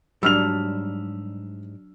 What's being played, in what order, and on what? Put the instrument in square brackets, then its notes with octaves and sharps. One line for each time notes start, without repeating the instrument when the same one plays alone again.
[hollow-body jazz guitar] G#2 G3 [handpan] F#3 D4 [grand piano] E6 F6 F7